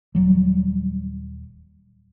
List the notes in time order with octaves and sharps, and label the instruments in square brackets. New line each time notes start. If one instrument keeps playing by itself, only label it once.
[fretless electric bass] D#1 F#3 G3